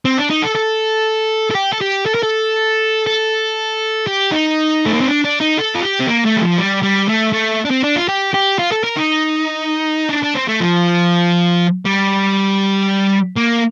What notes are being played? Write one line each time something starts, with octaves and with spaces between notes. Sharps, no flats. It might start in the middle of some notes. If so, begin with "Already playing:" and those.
C4
D4
D#4
A4
A4
A4
G4
A4
G4
A4
A#4
A4
A4
G4
D#4
A3
A#3
C4
D4
D4
D#4
A4
F4
G4
C4
A#3
A3
G3
F3
G3
G3
A3
A3
D4
C4
D4
F4
G4
G4
F4
A4
A#4
D#4
D4
D4
C4
A3
F3
G3
A#3